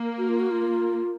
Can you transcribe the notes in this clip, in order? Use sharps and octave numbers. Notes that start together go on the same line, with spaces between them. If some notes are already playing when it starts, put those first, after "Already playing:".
Already playing: A#3
F#4
F4
F#4
F4